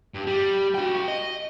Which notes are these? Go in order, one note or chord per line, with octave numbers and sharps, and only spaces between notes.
G2
G3
F#4 G5
D#5